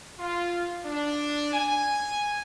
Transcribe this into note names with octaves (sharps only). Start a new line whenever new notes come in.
F4
D4
G#5